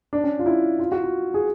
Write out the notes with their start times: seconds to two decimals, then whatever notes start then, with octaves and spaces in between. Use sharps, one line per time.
0.13 D4
0.24 C#4
0.39 F4
0.46 E4
0.79 F4
0.92 F#4
1.04 F4
1.34 G#4